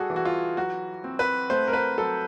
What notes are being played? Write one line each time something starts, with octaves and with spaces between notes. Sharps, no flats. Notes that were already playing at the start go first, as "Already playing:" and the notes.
Already playing: G3 F#4 G#4 A4
E3
F#4
F4
F#3 F#4
C4
B4
A3 C5
A#4
B4
F#3 A4